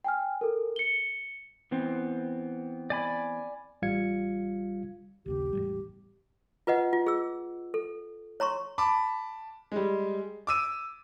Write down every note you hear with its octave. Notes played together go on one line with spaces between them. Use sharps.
G5 G#5 F6
A4 A#4
C#7 G7
E3 B3 C4
D5 G#5 B5
A1 G3 F4 F5 G#6 C#7
A#1 D#2 C#3 G4
E1 A1 G3
F4 B4 D#5 F#5
F4
G#4 E6
A4
C#5 A#5 C6 C#6
A5 B5 D6
G3 G#3
D6 E6 D#7